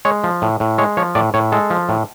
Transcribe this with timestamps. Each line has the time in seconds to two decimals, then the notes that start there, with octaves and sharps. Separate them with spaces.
0.05 G#3 C#5
0.24 F3
0.42 A2
0.60 A2
0.78 G#3 C#5
0.97 F3 C#5
1.15 A2 D5
1.34 A2 C#5
1.52 G#3 A4
1.70 F3
1.89 A2